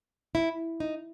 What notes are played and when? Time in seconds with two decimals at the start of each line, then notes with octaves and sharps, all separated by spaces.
0.35 E4
0.80 D#4